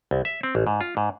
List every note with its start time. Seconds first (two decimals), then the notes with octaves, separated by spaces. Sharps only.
0.11 C2
0.25 E5
0.43 C4
0.55 A1
0.67 G#2
0.81 F4
0.97 G#2